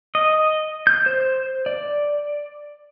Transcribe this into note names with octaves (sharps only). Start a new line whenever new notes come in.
D#5
G6
C5
D5